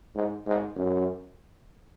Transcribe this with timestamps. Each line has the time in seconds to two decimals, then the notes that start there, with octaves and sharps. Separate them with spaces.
0.15 G#2
0.47 G#2
0.76 F#2